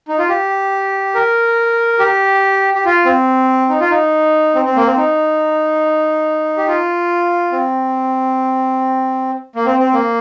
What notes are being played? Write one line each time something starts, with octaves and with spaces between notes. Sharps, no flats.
D#4
F4
G4
A#4
G4
G4
F4
C4
D#4
F4
D#4
C4
C4
A#3
C4
D#4
G4
F4
C4
A#3
C4
C4
A#3